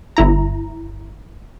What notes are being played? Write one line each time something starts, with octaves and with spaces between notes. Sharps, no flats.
G1 E4 A#5